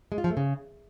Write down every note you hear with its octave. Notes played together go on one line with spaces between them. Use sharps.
G#3
F4
F3
A3
C#3